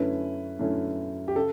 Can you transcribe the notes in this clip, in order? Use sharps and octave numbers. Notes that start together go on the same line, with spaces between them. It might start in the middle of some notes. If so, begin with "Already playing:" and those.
Already playing: F#2 D3 A3 C#4 E4 B4
F#2 D3 A3 C#4 E4
G4
C#3 A4